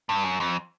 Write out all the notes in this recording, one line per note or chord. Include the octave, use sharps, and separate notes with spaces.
G2
F#2
F2